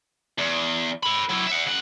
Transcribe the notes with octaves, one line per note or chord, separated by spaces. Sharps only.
E2
A4 B5
F#3 E4
E5 F#5
C#3 F#5